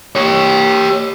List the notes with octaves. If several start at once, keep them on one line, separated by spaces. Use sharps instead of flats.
G4 C#5